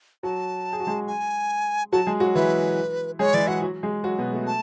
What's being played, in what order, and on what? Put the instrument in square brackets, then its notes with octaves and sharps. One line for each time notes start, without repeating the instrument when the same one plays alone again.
[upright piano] F#3 F#4 [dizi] A5
[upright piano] G#4
F#4
G#3 G#4
[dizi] G#5
[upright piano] F#3 F#4 [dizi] A5
[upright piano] G#3 G#4
F#3 F#4
[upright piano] E3 E4 [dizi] B4
[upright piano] G#3 G#4 [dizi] C#5
[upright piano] E3 E4 [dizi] D5
[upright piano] F#3 F#4 [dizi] F#5
[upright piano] F#3 F#4
G#3 G#4
F#3 F#4
B2 B3
A3
[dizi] A5